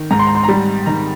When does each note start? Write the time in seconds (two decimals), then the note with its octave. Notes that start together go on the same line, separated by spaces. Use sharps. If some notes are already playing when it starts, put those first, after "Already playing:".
Already playing: D#3
0.11 G#2 A#5
0.19 C6
0.27 A#5
0.35 C6
0.43 G3 A#5
0.86 D#3 A#5